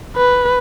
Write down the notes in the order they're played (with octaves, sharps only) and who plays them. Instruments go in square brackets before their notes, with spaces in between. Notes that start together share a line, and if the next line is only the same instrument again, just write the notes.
[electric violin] B4